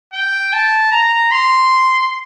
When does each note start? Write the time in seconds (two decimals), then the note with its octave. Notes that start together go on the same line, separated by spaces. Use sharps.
0.13 G5
0.53 A5
0.92 A#5
1.32 C6